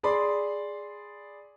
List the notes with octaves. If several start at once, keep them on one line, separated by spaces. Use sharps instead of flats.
G#4 D5 B5 C6